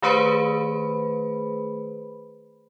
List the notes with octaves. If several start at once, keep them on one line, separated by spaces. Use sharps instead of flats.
D#3 A3 G#4 B4 C5 B5